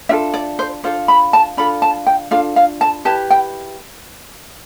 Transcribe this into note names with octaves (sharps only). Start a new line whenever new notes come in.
D4 F4 A4 E5
D5
C5
D4 F4 A4 C5
B5
A5
D4 F4 A4 B5
A5
G5
D4 F4 A4 F5
F5
A5
E4 G4 B4 A5
G5